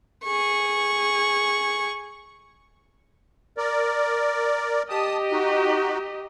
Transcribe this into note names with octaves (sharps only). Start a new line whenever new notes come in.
G#4 C#6
A#4 D5
G4 D#5 A5 D#6
D#4 F#4